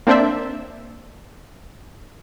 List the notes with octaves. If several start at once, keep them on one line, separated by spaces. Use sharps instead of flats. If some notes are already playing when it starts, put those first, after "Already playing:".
A#3 C4 D4 C5 D5 E5